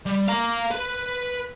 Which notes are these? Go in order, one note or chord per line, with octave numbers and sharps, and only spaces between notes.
G3
F5 A#5
B4